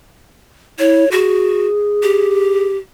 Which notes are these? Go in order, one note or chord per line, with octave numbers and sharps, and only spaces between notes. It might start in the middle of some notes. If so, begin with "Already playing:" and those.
E4 C#5
F#4 G#4
G4